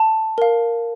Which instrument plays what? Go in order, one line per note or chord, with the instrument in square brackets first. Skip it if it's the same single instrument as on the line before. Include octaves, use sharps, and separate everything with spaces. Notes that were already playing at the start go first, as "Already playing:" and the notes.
Already playing: [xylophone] A5
A#4 F5